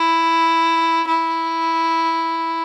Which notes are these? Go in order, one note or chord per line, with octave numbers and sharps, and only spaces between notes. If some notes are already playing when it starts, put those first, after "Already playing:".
Already playing: E4
E4